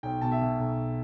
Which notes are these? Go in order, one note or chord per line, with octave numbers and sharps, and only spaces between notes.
B1 G5
B2 A5
E5
B2
B1